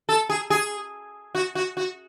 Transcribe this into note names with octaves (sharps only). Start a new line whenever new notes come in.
A4
G#4
G#4
F#4
F#4
F#4